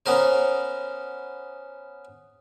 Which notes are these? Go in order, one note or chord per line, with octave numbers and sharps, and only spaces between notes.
B3 C#4 A#4 C5